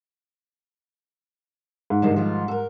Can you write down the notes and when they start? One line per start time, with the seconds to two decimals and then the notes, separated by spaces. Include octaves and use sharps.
1.90 G#2
2.02 G2 C3 D#3
2.16 D#3 F3 F4
2.48 A4 A#4